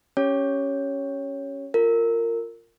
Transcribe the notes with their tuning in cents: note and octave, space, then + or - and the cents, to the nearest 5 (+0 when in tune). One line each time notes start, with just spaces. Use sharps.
C#4 +0 G4 +0 C#5 +0
F4 +0 A#4 -20